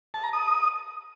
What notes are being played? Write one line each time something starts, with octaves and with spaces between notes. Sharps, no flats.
A5
A#5
D#6